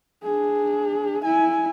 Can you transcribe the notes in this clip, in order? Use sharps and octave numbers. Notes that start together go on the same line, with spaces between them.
D4 G#4
E4 G#5